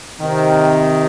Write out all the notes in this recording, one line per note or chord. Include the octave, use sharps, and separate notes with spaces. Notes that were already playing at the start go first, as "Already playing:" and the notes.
C3 D#3